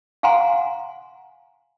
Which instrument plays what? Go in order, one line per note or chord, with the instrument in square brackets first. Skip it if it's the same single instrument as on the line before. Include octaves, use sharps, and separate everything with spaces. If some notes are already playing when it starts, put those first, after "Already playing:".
[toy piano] F5 F#5 G#5 A#5 C6